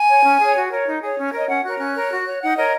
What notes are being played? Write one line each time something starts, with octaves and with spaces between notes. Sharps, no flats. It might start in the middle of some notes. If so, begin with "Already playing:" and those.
Already playing: G#5
C#5
C#4
G#4 C#5
F#4
A#4 C#5
D#4
G#4 C#5
C#4
A#4 C#5 D#5
C#4 F#5
F#4 A#4 C#5 F#6
C#4 F#6
A#4 C#5
F#4
C#5
D#4 F#5
A#4 C#5 D#5